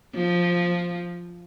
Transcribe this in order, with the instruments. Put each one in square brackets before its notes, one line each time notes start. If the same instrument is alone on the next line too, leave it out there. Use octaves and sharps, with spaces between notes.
[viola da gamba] F3